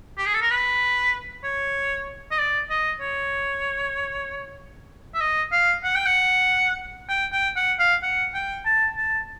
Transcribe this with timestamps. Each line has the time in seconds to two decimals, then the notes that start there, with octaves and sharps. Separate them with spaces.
0.18 G4
0.26 G#4
0.34 A4
0.42 A#4
0.50 B4
1.44 C#5
2.31 D#5
2.38 D5
2.70 D#5
3.01 C#5
5.14 E5
5.21 D#5
5.52 F5
5.84 F#5
5.95 G5
6.06 F#5
7.09 G5
7.32 G5
7.56 F#5
7.79 F5
8.03 F#5
8.34 G5
8.66 A5
8.97 A5